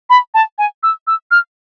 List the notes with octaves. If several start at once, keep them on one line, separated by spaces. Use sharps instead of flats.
B5
A5
G#5
E6
E6
F6